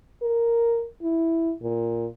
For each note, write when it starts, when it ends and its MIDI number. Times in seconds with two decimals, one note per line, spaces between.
0.22 0.86 70
1.02 1.52 64
1.63 2.07 46